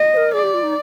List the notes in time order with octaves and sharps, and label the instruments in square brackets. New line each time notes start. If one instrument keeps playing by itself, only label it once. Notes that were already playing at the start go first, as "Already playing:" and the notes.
Already playing: [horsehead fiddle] D#5
[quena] C5
A#4
[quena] G#4 [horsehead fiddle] D5
[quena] G4
F4
D#4